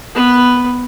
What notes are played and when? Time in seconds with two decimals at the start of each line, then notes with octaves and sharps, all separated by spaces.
0.15 B3 B4